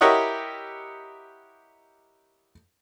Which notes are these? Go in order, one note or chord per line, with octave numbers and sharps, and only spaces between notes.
E4 G4 A#4 C#5 D#5 F#5